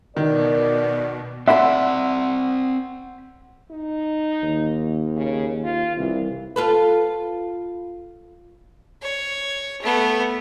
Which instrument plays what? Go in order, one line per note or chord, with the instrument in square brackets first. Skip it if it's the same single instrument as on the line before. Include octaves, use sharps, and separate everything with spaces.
[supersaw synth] B2 [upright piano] D#3 [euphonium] A#4 [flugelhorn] D5
[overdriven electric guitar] C4 D5 [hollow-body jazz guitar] E5 B5 [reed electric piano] F#5 C6 E6
[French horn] D#4
[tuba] D#2
[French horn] C#3
F4
[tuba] C2 [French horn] E3
[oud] F4 A4 B4
[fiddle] C#5
A3 B3